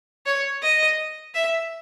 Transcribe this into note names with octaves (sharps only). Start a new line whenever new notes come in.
C#5
D#5
E5